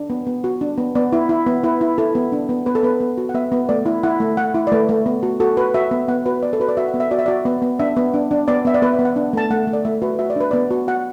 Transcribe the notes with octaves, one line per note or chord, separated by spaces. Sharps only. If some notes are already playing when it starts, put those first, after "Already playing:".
Already playing: D4
B3
B3
F#4
D4
B3
B3 D5
E4
E4
B3
E4 B4
E4
E4 A4
B3
D4
B3
B3 B4
A4
B3 B4
B3
F#4
F#5
B3 E5
B3
A3 D5
E4
E4 F#5
A3
A3 F#5
E4
D5
A3 B4
A3
B3
F#4
F#4 A4
F#4 B4
F#4 E5
B3
B3 F#5
F#4 B4
B3 D5
A4
F#4 B4
D5
F#4 E5
F#5
B3
E5
F#4 D5
E5
F#4 D5
B3
B3
D4 E5
B3
D4
D4
B3 D5
B3 E5
D5
B3 B4
E5
B3
F#5
D4
A3 A5
A3 F#5
A3
D5
A3 E5
F#4 B4
F#4 E5
D5
D4 B4
B3 D5
F#4
F#4 F#5